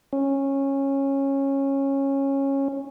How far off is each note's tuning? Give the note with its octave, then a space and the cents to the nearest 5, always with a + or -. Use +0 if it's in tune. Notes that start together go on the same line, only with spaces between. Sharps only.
C#4 -15